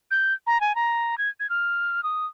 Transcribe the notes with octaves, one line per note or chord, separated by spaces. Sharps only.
G6
A#5
G#5
A#5
G#6
G#6
F6
D#6